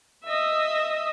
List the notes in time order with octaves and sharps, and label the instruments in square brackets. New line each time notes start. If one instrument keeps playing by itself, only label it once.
[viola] D#5 E5